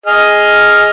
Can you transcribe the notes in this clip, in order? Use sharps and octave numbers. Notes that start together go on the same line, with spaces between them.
G#4 D#5 F6